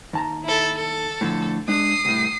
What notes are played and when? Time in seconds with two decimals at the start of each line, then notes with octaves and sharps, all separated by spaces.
0.13 D#2 A5 A#5
0.44 E4 A4
0.77 A4
1.21 A2 D3 F3
1.68 G#3 D4 D#6 C7
2.05 C2 A2